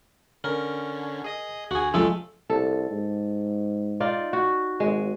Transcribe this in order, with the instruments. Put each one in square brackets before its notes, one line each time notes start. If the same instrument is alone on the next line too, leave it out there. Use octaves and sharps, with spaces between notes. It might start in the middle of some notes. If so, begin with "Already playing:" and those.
[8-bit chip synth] D3 C#4 [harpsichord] A#4
[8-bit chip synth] G#4 D#5 D#6
[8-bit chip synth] D2 [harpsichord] F#4 G#4
[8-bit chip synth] C#2 F#2 [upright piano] F3 [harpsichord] G#3 A3 A4
[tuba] C2 [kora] A4
[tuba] G#2
[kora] D#4 F4 D5
F#4
[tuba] G#1 [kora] G#3